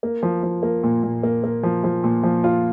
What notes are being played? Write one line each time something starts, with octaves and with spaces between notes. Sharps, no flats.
A#3
F3
F3
A#3
A#2
A#2
A#3
A#3
F3
F3
A#2
F3
F4